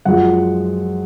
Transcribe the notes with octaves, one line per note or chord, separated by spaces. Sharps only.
F#2 F3 G#3 F#5